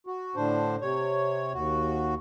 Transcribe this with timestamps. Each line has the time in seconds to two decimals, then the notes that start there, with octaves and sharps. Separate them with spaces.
0.07 F#4
0.36 A2 D3 D4 C5
0.81 C3 C#5
1.54 D#2 F#4